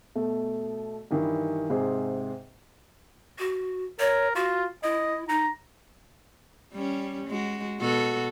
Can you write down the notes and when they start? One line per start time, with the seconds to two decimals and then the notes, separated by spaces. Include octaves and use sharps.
0.15 B2 A3
1.11 G2 D#3 E3
1.70 G#2 C3 G#4 C5
3.39 F#4
4.00 A#4 C#5
4.35 F4 F#4
4.84 E4 D#5
5.29 D#4 A#5
6.73 G3 C#4
7.28 G#3 F#4
7.80 B2 F#4 A4